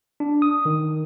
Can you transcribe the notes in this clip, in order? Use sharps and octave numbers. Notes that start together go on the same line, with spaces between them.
D4
D#6
D#3